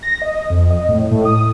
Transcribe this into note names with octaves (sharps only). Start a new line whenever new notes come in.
A#6
D#5
F2
D#5
A2
A2
D#6